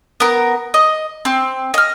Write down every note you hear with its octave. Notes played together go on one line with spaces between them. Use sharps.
B3 A#4
D#5
C4
D#5 F6